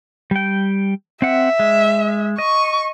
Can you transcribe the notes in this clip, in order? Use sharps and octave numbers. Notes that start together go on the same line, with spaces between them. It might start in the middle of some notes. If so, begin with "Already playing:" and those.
G3 G5
C4 E5 F#5
G#3
D#5 C#6